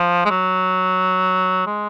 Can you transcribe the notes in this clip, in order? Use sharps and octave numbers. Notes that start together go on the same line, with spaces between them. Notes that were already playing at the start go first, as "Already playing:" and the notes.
Already playing: F3
G#3
F#3
G#3